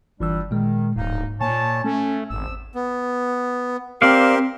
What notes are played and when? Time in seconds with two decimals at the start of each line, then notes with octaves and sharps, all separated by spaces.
0.20 G1 E3 G3 D4 E6
0.51 A#2 D#3 G#3
0.96 D1 G#2 A#3 D#4
1.41 A#2 C#5 G#5 A5
1.84 A3 C#4
2.30 G#1 E2 F3 E6
2.75 B3
4.02 C4 G4 A#4 D5 F5 C6